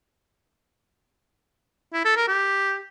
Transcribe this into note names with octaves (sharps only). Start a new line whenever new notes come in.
E4
A4
A#4
G4